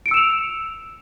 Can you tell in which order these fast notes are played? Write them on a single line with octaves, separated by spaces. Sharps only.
D7 C#7 E6 E7 F7